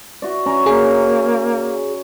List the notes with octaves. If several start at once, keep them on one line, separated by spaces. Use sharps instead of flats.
F#4 D5
C#4 A#5 C#6
A#3 C#4 G#4